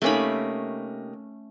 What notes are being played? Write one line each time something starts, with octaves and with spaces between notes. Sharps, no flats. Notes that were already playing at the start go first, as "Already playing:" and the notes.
C3 A3 A#3 C#4 D#4 B5